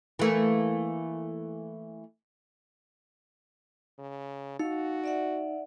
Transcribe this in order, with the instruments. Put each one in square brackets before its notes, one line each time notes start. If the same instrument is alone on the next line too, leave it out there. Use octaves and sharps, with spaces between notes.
[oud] E3 A3 A#3
[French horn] C#3
[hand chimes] D#4 [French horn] F#4 [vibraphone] F5
[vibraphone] D5 E5 F#5